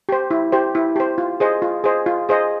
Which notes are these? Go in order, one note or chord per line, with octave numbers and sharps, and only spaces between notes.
G4 C5
E4
G4 C5
E4
G4 C5
F4
G#4 C5 D#5
F4
G#4 C5 D#5
F4
G#4 C5 D#5